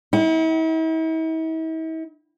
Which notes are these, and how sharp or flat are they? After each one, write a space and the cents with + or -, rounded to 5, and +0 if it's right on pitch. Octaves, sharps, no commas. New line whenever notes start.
E4 -45 F#5 +35